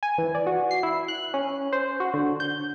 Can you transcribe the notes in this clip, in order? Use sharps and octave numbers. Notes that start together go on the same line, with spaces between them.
G#5
E3
D5
F#4
C7
E4
F#6
C#4
C5
F#4
D3
G6